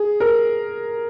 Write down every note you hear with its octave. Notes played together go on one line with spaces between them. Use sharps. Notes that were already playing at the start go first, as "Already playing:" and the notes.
Already playing: G#4
A#4